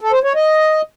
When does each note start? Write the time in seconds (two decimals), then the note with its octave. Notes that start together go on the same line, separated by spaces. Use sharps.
0.01 A4
0.12 C5
0.24 C#5
0.35 D#5